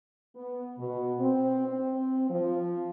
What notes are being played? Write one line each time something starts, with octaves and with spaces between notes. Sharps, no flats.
B3
B2
C4
C4
F3